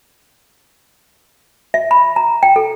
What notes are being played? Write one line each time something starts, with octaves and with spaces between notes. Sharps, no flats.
E5
B5
A#5
G5
A4